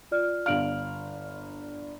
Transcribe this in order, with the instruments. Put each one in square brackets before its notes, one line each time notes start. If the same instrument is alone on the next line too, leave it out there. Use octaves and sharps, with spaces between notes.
[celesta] F4 D5 F6
[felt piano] G1 D4 F6 [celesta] F5 D7 F#7